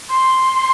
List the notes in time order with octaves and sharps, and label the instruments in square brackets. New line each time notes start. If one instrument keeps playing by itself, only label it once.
[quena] C6